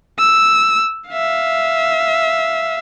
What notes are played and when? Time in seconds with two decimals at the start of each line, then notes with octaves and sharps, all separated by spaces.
0.19 E6
1.10 E5 F5